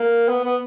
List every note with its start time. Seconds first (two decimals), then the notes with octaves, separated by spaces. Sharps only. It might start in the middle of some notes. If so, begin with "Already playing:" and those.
Already playing: A#3
0.28 B3
0.44 B3